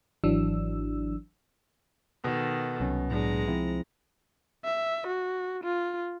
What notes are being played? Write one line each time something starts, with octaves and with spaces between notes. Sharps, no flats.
G#1 E3 F#3 D4 E6
B2 D#3 A4
C2 F#3 C#4
A2 F#3 G#3 D4 A#5
F3 C4 E4
E5
F#4
F4